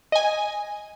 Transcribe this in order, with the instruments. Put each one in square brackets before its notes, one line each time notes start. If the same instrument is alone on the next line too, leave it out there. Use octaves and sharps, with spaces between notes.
[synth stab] D#5 G#5